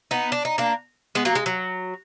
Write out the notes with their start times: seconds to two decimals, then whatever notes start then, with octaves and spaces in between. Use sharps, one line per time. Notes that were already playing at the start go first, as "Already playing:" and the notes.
0.11 B3 D#4
0.32 D4
0.45 D#4
0.58 A#3 D4
1.15 G#3 B3
1.25 F#3 A#3
1.35 G#3
1.46 F#3